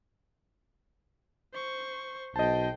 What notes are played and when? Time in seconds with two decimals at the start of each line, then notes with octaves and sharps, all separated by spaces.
1.54 C5 C#6
2.36 B1 C5 D#5 G5 A5